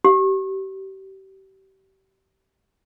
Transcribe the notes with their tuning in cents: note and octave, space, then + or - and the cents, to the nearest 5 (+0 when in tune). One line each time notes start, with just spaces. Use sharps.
G4 -30